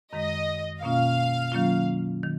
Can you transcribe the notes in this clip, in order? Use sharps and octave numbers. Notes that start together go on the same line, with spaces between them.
F#2 D#3 G#3 D#5
B2 A#3 C#4 F4 F5
D#3 F#3 A#3 C#4 F4
D#3